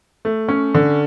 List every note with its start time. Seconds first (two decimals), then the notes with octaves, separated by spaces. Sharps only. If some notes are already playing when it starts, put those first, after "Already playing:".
0.25 A3
0.48 C#4
0.74 D3